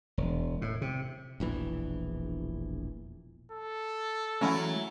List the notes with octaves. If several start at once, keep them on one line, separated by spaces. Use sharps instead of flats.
E1
A2
C3
E1 A#1 E3
A4
E3 F#3 G#3 A3 C#4 E4 F#5